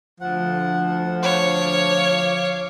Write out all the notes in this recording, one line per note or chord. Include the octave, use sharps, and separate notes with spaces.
D2 F3 F#5
C#5 F5 D6